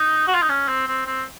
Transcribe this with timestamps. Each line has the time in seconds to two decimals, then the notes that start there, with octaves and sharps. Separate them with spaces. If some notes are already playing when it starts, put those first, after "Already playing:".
Already playing: D#4
0.27 F#4
0.34 F4
0.42 D#4
0.49 C#4
0.68 C4
0.87 C4
1.06 C4